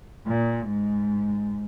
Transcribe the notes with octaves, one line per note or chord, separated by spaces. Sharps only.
A#2
G#2